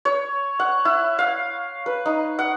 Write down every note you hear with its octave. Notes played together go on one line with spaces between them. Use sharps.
C#5
F#5
E4
F5
B4
D#4
F#5